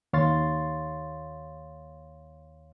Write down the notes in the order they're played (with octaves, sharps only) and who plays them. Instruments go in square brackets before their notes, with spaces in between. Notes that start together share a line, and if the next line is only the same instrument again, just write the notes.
[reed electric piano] D#2 C#5 F5 C6 A6